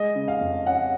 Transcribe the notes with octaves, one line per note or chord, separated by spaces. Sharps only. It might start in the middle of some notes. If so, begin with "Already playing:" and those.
Already playing: G#3 D#5
C#3
F5
F2
C#4 F#5